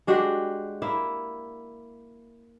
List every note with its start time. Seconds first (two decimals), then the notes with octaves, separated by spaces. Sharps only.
0.07 G#3 D4 F#4 G4
0.82 A#3 E4 E5